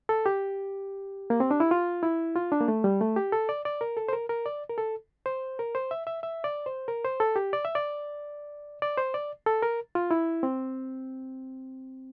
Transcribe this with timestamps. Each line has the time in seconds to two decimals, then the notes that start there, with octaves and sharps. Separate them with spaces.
0.09 A4
0.26 G4
1.30 A#3
1.40 C4
1.51 D4
1.60 E4
1.71 F4
2.03 E4
2.36 F4
2.52 D4
2.60 A#3
2.68 A3
2.84 G3
3.01 A3
3.16 G4
3.32 A4
3.49 D5
3.65 D5
3.81 A#4
3.97 A4
4.09 C5
4.13 A#4
4.29 A#4
4.46 D5
4.69 A#4
4.78 A4
5.26 C5
5.59 A#4
5.75 C5
5.91 E5
6.07 E5
6.23 E5
6.44 D5
6.66 C5
6.88 A#4
7.05 C5
7.20 A4
7.36 G4
7.53 D5
7.65 E5
7.75 D5
8.82 D5
8.98 C5
9.14 D5
9.46 A4
9.62 A#4
9.95 F4
10.11 E4
10.43 C4